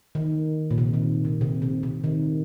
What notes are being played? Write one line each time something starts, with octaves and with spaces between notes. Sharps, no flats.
D#3
A#2
C3
D#3
C3
C3
C3
C3
D#3